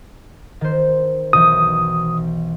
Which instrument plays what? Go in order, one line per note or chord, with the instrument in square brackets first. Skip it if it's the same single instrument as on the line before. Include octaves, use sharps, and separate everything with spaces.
[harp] D#3 C5
[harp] B1 E3 G6 [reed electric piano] D#6